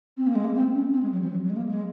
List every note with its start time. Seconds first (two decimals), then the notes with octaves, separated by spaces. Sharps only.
0.17 C4
0.27 A#3
0.35 G#3
0.44 A#3
0.55 C4
0.74 C#4
0.93 C4
1.03 G#3
1.12 F#3
1.22 F3
1.31 F#3
1.44 F#3
1.50 G#3
1.56 A#3
1.69 G#3